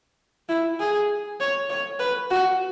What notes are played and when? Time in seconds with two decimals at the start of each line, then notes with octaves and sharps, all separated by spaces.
0.49 E4
0.80 G#4
1.40 C#5
1.70 C#5
2.00 B4
2.30 F#4